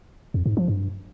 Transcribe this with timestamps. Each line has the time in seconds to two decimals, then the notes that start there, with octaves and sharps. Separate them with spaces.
0.34 F2
0.46 G#2
0.57 F3
0.68 G2